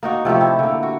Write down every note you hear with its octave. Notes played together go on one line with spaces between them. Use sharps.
A#3 D#4 F#4
C3 F3 A3 G4
E4
D3 A#3
F#4